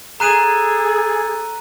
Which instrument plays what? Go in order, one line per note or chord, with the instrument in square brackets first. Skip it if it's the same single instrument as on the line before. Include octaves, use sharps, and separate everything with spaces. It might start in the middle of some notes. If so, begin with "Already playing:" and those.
[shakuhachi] G#4 [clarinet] A4 [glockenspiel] A#5 F#6 D#7